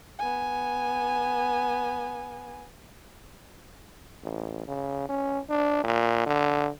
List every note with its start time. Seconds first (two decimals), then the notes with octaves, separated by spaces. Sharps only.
0.19 B3 G#5
4.23 A1
4.68 C#3
5.09 C#4
5.50 D4
5.84 A#2
6.26 D3